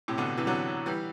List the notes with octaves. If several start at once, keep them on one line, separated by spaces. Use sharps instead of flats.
A2 C3
B2 D3
C3 E3
D3 F#3
E3 G3